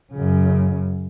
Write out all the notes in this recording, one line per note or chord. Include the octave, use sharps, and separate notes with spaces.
F#2 C#3